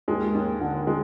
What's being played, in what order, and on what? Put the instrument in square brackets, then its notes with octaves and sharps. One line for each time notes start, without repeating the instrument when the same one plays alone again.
[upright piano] D#2 G#3
D#2
D3
G#3